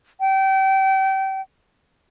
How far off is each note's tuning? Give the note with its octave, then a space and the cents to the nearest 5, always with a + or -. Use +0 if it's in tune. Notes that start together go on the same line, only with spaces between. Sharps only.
G5 -30